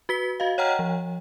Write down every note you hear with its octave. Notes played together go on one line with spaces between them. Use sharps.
F#4 B4 B6 G7
F#4 D#5 F5
C#5 D#5 F#5 G5 A#5 F6
F3